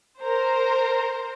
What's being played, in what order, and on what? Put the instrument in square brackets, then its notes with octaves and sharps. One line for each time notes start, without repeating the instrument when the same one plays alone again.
[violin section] A#4 C5